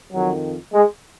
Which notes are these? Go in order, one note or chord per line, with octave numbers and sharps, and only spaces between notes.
F2 D#3 F#3
G#3